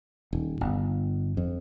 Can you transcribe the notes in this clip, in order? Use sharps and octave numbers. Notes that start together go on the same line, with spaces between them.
D#1
G1
F2